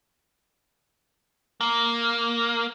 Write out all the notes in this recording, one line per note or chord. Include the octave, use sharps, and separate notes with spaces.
A#3